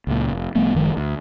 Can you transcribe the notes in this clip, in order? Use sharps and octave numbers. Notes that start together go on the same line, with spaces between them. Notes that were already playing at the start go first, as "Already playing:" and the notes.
C#2 A#2
F1
C2 F3 A3 B3
F#1 D#3 F3 G#3
D2